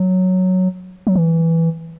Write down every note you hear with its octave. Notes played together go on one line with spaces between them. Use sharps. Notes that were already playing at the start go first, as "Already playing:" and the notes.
Already playing: F#3
F#3
E3